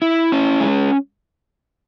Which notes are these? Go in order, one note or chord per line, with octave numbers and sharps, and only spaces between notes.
E4
C#4
G#3